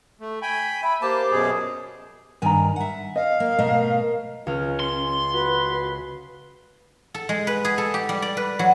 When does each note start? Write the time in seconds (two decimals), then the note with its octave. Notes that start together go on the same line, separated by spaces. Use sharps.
0.21 A3
0.42 G5 G#5 B5
0.83 E5 B5
1.02 A#3 G4 C5 A5 D6
1.31 F#2 B2 G#4
2.42 G2 D#3 G#5 A#5
2.76 E5 F#5
3.16 D#5 F5
3.40 A#3
3.58 B2 A3 A#4 D#5
4.47 C#2 C#4 F6
4.79 C6
5.31 F#4 B4
7.14 A4
7.29 G#3
7.47 B4
7.65 G#4
7.78 A4
7.94 G4
8.09 G3
8.22 D5
8.37 B4
8.59 F#3